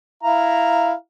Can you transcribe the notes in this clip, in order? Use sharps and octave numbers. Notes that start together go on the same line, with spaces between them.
E4 F5 A#5